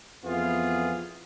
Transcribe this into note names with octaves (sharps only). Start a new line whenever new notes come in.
F2 E3 B3 F4 G#4